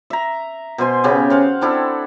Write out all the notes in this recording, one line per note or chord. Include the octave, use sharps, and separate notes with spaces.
E5 A#5
B2 C5 G#5 C6
C#3 B3 C#4 G4
C5 F5 F#5
C4 D4 E4 A4